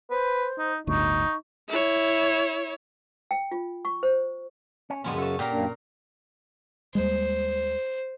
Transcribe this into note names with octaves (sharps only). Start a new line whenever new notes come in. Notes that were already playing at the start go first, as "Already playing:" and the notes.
B4 C5
D#4
G1 D2 A2 D#4 C#6
E4 C#5
G5
F4
C#6
C5
C#4
F#2 A#2 C#3 F3 G3 G#3 B3 C#4
F#4 A4 C#5 A5
A#2 G4 A#4 A#5
F#2 A#3 D4
D#2 G3 G#3 C5